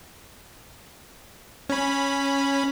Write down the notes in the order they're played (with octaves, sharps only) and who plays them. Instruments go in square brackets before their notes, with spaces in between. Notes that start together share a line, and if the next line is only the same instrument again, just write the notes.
[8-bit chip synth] C#4 B5